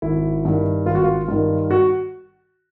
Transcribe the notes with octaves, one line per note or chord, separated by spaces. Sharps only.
G#1 E4
G2 D#3
G#1 F4
F#4
F4
G2 D#3 F4
F#4